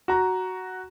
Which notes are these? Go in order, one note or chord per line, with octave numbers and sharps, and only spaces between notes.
F#4 A#5